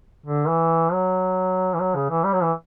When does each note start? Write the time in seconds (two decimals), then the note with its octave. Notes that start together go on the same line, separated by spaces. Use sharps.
0.26 D3
0.48 E3
0.93 F#3
1.74 E3
1.80 F#3
1.95 C#3
2.10 E3
2.24 G3
2.33 F#3
2.43 E3